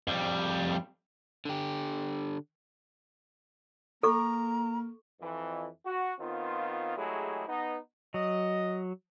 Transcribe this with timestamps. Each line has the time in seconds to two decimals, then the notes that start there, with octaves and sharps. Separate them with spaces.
0.07 F2 G3
1.45 D3 G4
4.03 A#3 A4 A#5 C#6
5.20 F2 E3
5.85 F#4
6.20 D#3 B3 C4 F4
6.96 F#3 G#3 A3 E4 G4 G#4
7.48 B3 D#4
8.14 F#3 D#5